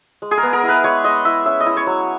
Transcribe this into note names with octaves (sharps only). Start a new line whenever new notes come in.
G#3
G#4
A#4
B3
A#4
E4
B4
G#3 C#5
G#3 D#5
E4 E5
C#4 E5
D#5
E4
C#5
F#3